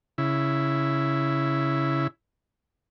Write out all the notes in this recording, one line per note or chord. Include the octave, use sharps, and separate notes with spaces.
C#3 E4